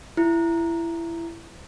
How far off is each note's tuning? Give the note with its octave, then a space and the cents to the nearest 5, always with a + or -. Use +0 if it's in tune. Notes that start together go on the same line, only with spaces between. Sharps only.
E4 +20